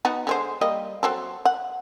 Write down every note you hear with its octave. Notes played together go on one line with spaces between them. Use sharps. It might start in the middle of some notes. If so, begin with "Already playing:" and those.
B3 D#4 F#4
D3 G#3 C5
G3 A#3 D#5
F#3 C4 A4
F#5